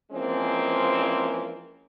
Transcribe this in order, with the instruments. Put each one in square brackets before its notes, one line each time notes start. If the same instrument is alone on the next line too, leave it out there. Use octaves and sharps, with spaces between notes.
[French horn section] E3 F3 G#3 A#3 C4 C#4